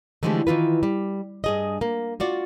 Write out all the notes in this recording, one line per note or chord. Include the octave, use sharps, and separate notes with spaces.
D3 E3 F3 G#3 A3 G4
D#3 E3 F4 B4
G3
G2 G#4 D#5
A#3
F4 F#4 D5